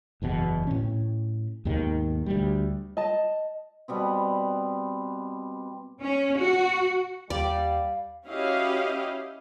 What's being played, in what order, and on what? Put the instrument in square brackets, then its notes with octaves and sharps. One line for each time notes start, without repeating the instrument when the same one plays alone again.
[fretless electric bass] F#1 E2 G#2 B2
A2 C#4
D#2 G#2 B2 D#3
D2 G3
[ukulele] D#5 A5
[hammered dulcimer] B2 G3 B3 C4
[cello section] C#4
F#4
[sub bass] D#2 [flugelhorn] G3 [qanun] D5 [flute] F5
[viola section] C#4 E4 F#4 G4 D#5 F5